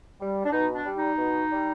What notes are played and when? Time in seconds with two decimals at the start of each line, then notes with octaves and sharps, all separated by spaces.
0.20 G3
0.45 D4
0.52 B2 D#4
0.75 D4
0.85 G3
0.96 D#4
1.18 B2
1.51 G3